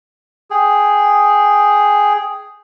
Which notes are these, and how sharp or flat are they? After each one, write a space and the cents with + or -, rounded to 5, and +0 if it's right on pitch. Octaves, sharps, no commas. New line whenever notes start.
G#4 +0 G5 +0